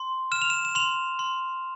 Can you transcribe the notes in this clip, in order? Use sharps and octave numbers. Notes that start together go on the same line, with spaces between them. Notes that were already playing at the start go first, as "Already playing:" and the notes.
Already playing: C6
F6 E7
F7
E7
E7
C6 F7
C6